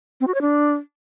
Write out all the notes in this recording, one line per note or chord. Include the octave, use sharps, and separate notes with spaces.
C4
F#4
C#5
D4